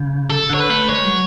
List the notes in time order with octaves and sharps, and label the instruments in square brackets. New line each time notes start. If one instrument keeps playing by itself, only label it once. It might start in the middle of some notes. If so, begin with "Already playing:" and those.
Already playing: [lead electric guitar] C#3
[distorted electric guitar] A4
[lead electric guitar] D3 [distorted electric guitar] C#5
[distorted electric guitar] B4
[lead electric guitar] A3
[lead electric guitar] G#3 [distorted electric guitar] C#5
[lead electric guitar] F#3